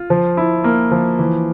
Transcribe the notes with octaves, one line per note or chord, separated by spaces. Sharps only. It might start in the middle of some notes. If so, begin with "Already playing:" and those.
Already playing: F4
F3
E4
A#3
F3
E3